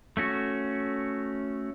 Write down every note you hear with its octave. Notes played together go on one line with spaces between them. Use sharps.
A3 C#4 F#4